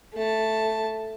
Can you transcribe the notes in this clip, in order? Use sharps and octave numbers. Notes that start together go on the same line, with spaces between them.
A3 A5